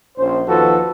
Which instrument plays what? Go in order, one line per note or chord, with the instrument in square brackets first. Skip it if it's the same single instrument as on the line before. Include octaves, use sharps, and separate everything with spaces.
[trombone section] A#1 C#4 C5
D#2 F3 F#4 A4 B4